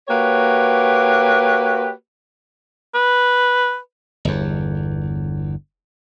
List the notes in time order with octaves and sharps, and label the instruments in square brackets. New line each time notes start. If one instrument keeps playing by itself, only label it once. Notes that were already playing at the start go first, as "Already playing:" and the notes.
[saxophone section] A#3 F#4 G4 B4 C#5
[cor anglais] B4
[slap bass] G1 E2